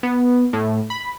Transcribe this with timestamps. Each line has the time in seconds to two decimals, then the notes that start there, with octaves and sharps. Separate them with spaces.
0.03 B3
0.53 A2
0.90 B5